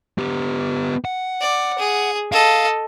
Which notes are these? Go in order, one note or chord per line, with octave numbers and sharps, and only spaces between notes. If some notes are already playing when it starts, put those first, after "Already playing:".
B3 G4
F#5
D5
G#4
A4 D#5 F5